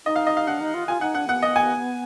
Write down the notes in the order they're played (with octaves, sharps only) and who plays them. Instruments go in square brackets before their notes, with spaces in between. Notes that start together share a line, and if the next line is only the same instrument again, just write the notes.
[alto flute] D#4 [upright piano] D#5
[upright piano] F5
D#5
F5
[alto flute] D4 [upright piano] F#5
[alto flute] D#4
F4
[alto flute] F4 [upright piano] G#5
[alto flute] D#4 [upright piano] F#5
[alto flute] D4 [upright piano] F#5
[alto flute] B3 [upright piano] F#5
[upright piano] D#5
G#5